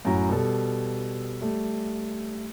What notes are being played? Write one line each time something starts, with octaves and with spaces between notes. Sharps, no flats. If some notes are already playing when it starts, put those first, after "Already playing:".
F#2 A2 F#4 A#5
B2 G3 A4
G3 A3